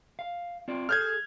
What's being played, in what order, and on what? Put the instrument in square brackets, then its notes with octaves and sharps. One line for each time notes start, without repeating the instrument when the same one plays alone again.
[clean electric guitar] F5
C4 F4 D5
[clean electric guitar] G#4 A4 [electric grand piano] F6 G6 G#6